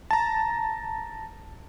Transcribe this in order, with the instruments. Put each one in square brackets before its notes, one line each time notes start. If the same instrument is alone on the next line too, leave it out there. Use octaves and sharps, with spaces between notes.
[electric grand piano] A5 A#5